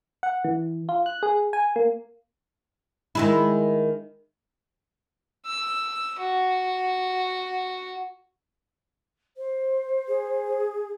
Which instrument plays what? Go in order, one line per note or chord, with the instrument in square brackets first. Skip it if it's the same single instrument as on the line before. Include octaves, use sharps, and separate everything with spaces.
[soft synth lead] F#5
E3
F4
F#6
G#4
G#5
A#3
[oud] D#3 G#3 E4
[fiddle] E6
F#4
[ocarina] C5
[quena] G#4